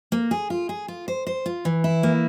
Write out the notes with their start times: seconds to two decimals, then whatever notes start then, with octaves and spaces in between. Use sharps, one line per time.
0.12 A#3
0.31 G#4
0.50 F4
0.69 G#4
0.88 F4
1.08 C5
1.27 C5
1.46 F4
1.65 E3
1.84 E4
2.03 A#3